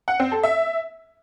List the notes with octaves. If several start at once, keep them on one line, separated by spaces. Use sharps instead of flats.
F#5
C4
A4
E5